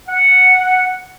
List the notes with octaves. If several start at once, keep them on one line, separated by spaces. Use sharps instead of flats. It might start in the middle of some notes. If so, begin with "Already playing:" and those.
F#5